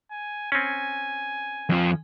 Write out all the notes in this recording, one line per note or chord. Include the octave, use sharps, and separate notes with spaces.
G#5
C4 C#4 G#5
F2 F3